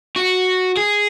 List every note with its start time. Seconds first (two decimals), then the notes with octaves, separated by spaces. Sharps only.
0.16 F#4
0.77 G#4